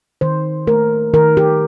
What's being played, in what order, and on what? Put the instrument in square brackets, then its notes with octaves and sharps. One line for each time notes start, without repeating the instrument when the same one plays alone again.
[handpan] D#3 C5
A3 A#4
D#3 A#4
G4